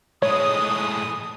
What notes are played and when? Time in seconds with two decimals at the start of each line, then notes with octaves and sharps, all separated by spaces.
0.22 A2 G#3 C#5 D#6